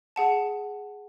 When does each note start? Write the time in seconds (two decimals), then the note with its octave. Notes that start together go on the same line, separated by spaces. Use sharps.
0.16 G#4 F#5 A5